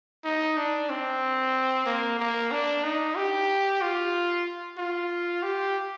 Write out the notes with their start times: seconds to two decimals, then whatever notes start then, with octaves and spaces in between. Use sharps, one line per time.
0.24 D#4
0.57 D4
0.90 C4
1.86 A#3
2.19 A#3
2.51 D4
2.84 D#4
3.16 G4
3.82 F4
4.78 F4
5.43 G4